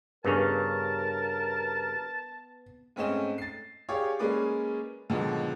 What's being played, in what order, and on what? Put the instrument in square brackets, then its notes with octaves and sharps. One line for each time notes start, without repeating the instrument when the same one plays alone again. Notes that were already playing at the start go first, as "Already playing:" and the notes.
[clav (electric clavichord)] G2 C#3 C#4 [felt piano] B3 [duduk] A#4 [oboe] A5
[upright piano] G#2 A3 C4 C#4 D#5 E7
A6 C7
G4 G#4 C#5 D5 F5
G#3 A#3 C#4 G#4 B4 D5
G#2 B2 D3 D#3 F3 F#3